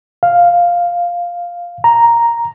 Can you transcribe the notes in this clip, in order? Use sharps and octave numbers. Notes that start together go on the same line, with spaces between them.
F5
A#5